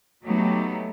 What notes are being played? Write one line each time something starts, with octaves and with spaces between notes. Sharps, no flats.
F#3 A3 B3 D#4 G4